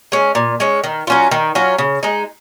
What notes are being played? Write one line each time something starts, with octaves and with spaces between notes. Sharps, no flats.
G#3 C#4
A#2
G#3 C#4
D#3
F#3 C#4 F4
D#3
F#3 C#4 F4
C#3
G#3 D#4